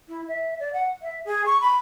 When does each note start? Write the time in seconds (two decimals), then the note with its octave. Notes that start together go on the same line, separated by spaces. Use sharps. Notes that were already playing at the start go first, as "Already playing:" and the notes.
0.08 E4
0.28 E5
0.60 D5
0.73 F#5
1.02 E5
1.25 G#4
1.46 C#6
1.61 B5